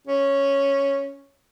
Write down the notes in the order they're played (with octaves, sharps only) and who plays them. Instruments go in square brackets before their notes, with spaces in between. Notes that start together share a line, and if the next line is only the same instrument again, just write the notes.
[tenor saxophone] C#4